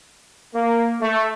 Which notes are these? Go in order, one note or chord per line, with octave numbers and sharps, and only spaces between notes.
A#3
A3